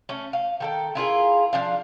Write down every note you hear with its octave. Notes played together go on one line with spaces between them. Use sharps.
A3 C#4
F5
D#3 A4 G5
E4 F4 G#4 A#4
F3 D4 F5